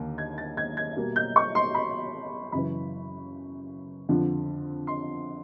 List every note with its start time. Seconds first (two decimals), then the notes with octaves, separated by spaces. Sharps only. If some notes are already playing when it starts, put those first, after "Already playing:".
Already playing: D#2 D3 A#3
0.18 G#6
0.38 A6
0.57 G#6
0.77 G#6
0.96 B2 G3 A#3
1.16 G6
1.36 C#6
1.55 C6
1.74 B5
2.52 F#2 C#3 E3 B5
4.09 F2 D3 F3
4.87 C6